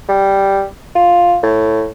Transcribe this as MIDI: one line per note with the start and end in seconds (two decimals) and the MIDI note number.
0.09 0.64 55
0.96 1.37 65
1.43 1.87 45